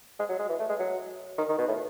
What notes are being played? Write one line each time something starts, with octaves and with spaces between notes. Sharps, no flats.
G#3
F#3
G#3
E3
A3
G#3
F#3
D#3
D#3
B2
A2